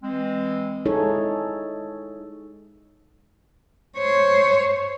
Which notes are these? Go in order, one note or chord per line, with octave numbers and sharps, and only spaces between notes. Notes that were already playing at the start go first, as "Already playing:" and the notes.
E3 G#3 C4
G#3 D#4 E4 G#4 A4 C#5
C5 C#5